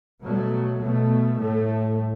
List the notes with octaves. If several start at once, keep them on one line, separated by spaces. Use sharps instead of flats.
B2 F#3 A3
B2 A3
A2 A3